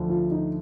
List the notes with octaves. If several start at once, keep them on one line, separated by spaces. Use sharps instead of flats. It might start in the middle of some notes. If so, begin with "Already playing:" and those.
Already playing: D2 D3 F3
F4
D#4